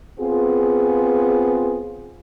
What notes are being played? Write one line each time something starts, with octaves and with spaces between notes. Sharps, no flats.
B3 C4 F4 G#4